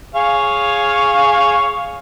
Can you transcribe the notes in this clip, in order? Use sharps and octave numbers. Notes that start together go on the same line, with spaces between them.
G#4 C#5 F5